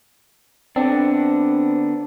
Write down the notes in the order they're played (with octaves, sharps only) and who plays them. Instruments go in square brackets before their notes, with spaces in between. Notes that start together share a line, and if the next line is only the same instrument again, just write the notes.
[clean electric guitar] D3 B3 D4 [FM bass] C4